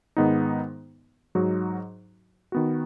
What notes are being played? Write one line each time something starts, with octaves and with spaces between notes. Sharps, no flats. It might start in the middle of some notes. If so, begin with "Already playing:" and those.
G#2 D#3 G#3 B3 D#4
G#2 F#3 D#4 F#4
D#3 B3 F#4